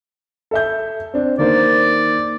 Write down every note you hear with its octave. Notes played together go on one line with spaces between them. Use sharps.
A4 E5 G6
C4 D4
D#3 A#3 C5 D5